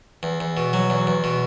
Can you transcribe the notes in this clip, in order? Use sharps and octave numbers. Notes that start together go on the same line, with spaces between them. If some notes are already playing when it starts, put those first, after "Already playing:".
E2
E2
B2
F#3
E2
E2
B2